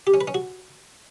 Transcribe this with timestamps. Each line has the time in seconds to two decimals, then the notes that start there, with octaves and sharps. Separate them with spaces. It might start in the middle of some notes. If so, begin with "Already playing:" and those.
0.07 G4
0.14 C#4
0.21 B4
0.28 C#4
0.34 F#4